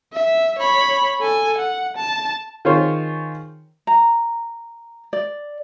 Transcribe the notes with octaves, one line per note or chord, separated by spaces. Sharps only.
E5
C#5 B5
A4 G#5
F#5
A5
D#3 F4 G#4 C5 C#5
A#5
D5